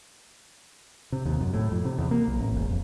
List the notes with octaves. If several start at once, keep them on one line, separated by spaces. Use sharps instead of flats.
C3
D#2
F#2
A2
F2
C3
E2
A#3
B1
A1
E1
F2